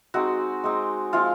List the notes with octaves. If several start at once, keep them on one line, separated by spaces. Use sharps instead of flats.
G#3 C4 D#4 F#4
G#3 C4 D#4
F3 G#3 C4 F4